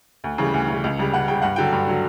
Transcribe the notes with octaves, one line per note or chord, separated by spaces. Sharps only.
D2
C#3 E3 G3
D2
C#3 E3 G3
C#2
C#3 G3
C#2 F#5
C#3 G3 G5
G2 F#5
D3 F#3 G5
G2 G5
D3 F#3